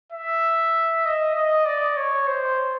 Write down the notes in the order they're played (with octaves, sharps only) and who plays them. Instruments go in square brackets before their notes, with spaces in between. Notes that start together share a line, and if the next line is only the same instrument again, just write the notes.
[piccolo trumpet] E5
D#5
D#5
D5
C#5
C5